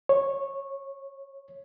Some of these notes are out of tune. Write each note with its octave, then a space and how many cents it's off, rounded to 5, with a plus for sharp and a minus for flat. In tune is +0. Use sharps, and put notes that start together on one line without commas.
C#5 -15